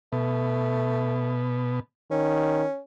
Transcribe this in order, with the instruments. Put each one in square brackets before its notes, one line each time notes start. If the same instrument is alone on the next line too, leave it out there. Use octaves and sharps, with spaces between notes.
[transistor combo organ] B2 [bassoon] A3
[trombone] D#3 [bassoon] C#4